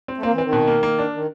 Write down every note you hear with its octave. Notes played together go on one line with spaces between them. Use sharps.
C4
A3
A#3 C4
E3
D#3 C4
B2
A#3
A#3
D4
D#3